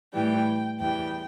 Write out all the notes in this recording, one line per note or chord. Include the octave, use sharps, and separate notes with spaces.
A2 E3 G3 G5
E2 E3 G3 G5